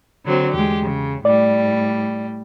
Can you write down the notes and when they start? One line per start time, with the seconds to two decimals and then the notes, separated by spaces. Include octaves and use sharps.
0.25 D3 F#3 C4
0.54 E2 G#3 G4
0.83 C#3
1.25 A2 G3 D5